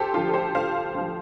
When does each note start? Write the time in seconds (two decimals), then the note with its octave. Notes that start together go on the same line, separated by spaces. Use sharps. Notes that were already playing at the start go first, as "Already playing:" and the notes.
Already playing: D2 G4 A4 C5
0.14 D3 F3 F4 A4
0.28 A4
0.34 G4 C5
0.54 D2 C5 F5
0.94 D3 F3